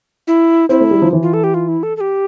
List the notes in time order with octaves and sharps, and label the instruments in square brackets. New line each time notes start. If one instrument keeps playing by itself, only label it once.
[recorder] E4
[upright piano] C4 [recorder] E4
[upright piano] A3
G3
F3
E3
[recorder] F4
A4
G4
F4
E4
A4
A4
G4